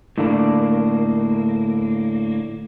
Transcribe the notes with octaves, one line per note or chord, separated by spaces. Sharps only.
A2 D3 A#3 D4